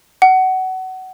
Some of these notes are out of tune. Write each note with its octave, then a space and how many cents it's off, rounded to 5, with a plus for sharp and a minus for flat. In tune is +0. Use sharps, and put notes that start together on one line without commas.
F#5 +25